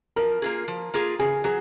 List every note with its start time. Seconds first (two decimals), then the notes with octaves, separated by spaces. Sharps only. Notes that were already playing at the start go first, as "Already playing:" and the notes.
0.16 F3 A#4
0.42 A#3 F4 G#4
0.68 F3
0.94 A#3 F4 G#4
1.19 C#3 G#4
1.44 F#3 G#4